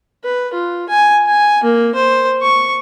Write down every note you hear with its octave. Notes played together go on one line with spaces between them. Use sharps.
B4
F4
G#5
G#5
A#3
C5
C#6